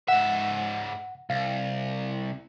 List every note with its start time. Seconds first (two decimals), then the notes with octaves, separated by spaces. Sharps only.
0.08 G#2 E5 F#5
1.30 C2 F5